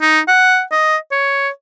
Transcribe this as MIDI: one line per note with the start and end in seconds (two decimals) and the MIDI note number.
0.01 0.20 63
0.28 0.62 78
0.72 0.97 75
1.11 1.48 73